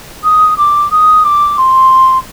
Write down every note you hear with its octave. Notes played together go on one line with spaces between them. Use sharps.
D#6
D6
D#6
D6
C6